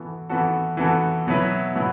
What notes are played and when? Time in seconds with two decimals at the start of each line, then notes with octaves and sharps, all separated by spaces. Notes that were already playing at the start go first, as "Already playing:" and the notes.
Already playing: E3 B3 F#4 A4
0.29 E3 B3 F#4 A4
0.77 E3 B3 F#4 A4
1.26 B2 F#3 B3 E4 B4
1.75 B2 F#3 B3 E4